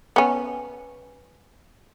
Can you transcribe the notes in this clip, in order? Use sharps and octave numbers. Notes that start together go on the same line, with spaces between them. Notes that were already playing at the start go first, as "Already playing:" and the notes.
B3 C#4